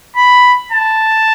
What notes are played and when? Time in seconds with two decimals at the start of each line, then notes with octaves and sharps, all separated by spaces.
0.16 B5
0.72 A5